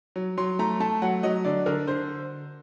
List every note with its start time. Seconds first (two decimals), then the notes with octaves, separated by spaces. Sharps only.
0.16 F#3
0.37 F#3 C6
0.59 A3 A#5
0.80 A3 A5
1.02 F#3 F#5
1.23 F#3 D#5
1.45 D3 D5
1.66 D3 A#4
1.87 D3 C5